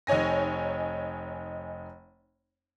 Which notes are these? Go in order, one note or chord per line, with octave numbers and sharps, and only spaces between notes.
F1 D#4 C#5 G#5 A#6